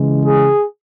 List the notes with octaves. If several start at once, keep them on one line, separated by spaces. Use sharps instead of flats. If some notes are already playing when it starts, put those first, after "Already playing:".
Already playing: C#3 E3 G#3
G#4